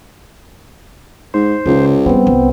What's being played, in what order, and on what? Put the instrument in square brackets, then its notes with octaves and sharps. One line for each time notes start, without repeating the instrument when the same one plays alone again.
[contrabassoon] G#2 [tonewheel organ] C5
[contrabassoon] C#2 [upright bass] C#3
[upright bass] F#3 G3 [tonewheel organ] B3 C4
[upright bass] C2